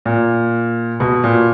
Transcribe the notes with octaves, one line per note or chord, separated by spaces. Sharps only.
A#2
B2
A#2